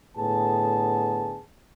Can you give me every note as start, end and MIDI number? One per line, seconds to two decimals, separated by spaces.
0.15 1.40 45
0.15 1.40 50
0.15 1.40 59
0.15 1.40 68
0.15 1.40 81